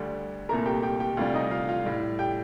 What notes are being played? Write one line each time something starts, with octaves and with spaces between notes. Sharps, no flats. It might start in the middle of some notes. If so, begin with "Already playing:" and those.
Already playing: D2 D3 G3
C2 A#2 A3 A#4 A#5
G4 G5
G4 G5
G4 G5
D2 C3 G3 F4 F5
D#4 D#5
F4 F5
F4 F5
A2 G3
G4 G5